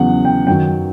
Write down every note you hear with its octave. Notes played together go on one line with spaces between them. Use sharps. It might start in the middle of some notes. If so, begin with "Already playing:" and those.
Already playing: E2 C#3 F#3 F#5
G5
F#2 D#3 F#3 G5